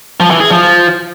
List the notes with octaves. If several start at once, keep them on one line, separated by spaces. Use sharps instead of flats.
F3
E3
G#4
F3